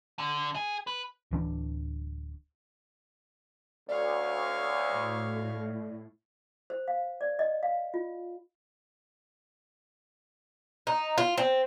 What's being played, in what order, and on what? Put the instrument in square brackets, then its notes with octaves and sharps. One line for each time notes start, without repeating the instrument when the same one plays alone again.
[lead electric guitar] D3
G#4
B4
[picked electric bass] D1 E3 D4
[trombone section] D2 [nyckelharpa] C#5 F5 [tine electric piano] D5
[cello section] A2
[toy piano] C5
F5
D5
D#5
F5
F4
[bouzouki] D#4
F4
C4